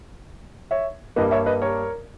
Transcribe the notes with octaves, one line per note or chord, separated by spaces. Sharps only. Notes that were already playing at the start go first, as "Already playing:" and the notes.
C#5 E5
G2 G3 A#3 B4 D#5
C#5 E5
B4 D#5
A#4 C#5